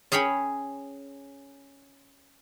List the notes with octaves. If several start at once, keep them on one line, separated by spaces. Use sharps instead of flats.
C#4 G#4 C#5 G5 B5